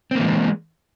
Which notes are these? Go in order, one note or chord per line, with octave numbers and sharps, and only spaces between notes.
E3 G#3 A#3 C4